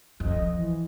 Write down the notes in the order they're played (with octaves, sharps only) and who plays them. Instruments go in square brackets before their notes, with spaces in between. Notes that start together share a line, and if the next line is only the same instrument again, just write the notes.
[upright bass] F2 [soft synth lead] D#5
[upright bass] F3
[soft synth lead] E3